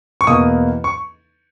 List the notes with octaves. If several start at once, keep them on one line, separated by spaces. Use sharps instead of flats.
C#6
E2 B2 A#3 D#6
C#6